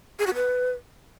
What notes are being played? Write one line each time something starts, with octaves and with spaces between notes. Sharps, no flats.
G#4
F#4
B4